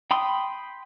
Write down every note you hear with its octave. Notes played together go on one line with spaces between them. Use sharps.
G5 B5 C6 D#6